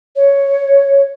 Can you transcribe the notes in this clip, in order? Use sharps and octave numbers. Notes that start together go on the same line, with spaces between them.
C#5